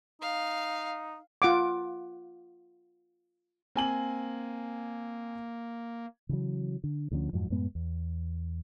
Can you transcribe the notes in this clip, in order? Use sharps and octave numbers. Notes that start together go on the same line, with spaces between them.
D#4 F5
F4 F#5 D6
A#3 C4 G#5 F#7
C#3 E3 F#3
D3
D2 D3 F3 C#4
F2 G#2 F3 F#3
F#2 A2 G#3 B3
E2